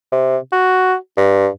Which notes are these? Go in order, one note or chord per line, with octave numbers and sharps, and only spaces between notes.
C3
F#4
G2